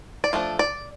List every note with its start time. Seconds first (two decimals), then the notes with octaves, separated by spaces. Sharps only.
0.24 D5
0.33 F3 A3 D4
0.59 D5